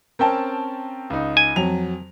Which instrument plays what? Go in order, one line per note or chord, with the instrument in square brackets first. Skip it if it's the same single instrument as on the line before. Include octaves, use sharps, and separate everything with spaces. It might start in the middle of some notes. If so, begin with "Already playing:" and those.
[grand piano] C4 C#4 G5 [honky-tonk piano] A#4 A5
[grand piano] C#2 D#4
[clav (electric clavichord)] G#5
[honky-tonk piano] F2 F#3 [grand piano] F7